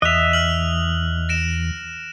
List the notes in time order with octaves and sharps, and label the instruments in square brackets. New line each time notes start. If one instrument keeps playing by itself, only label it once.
[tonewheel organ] E2 [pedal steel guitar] D#5 E5 [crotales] F#6 F7
[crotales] F6 F#7
A#6 D7 E7